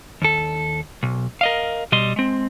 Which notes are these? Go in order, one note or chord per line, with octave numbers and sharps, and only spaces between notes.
D#2 A4
B1
A#4 D#5 F5
B2 G3 D#5 C6
G#3 C4